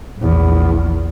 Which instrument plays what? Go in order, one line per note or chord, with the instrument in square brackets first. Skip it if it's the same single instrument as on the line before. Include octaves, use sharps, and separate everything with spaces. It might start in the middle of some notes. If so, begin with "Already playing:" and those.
[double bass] A#1 E2